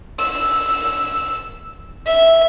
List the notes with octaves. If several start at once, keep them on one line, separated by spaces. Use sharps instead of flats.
E6
E5